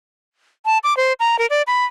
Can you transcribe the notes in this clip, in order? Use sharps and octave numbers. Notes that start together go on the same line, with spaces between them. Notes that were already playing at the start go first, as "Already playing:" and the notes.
A5
D6
C5
A#5
A#4
D5
B5